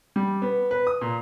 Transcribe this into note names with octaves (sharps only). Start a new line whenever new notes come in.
G3
B3
B4
D#6
A#2